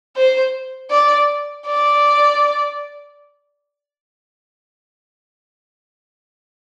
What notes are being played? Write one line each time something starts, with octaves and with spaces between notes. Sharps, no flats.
C5
D5
D5